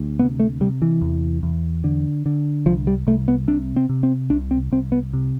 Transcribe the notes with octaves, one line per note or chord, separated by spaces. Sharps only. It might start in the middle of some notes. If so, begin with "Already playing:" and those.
Already playing: D2
C3 B3
A3
C3 G3
E3
E2
E2
D3
D3
C2 F3
G3
C2 A3
B3
C3 D4
C4
C3
C4
C2 D4
C4
C2 C4
B3
C3